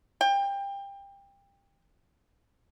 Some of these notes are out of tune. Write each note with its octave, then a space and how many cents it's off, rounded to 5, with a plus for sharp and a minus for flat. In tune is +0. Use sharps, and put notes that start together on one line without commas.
G5 +25